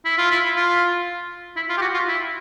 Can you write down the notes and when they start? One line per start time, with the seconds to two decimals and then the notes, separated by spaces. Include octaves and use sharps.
0.05 E4
0.18 F4
0.31 E4
0.56 F4
1.56 E4
1.69 F4
1.78 G4
1.82 F#4
1.94 F4
2.08 E4